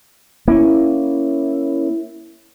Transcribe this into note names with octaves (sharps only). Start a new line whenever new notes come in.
A#3 C#4 E4